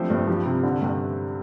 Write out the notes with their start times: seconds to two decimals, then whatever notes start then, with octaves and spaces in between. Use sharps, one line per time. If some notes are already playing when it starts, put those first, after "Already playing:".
Already playing: F3 G3 A3 C4 D4 G4 A4 C5
0.10 G2 A3 A4
0.27 F3 G3 G4
0.45 C3
0.63 D3
0.82 G2